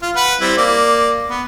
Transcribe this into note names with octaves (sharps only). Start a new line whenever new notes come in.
F4
B4 F#5
G3 C4 E4
A#3 D5
B3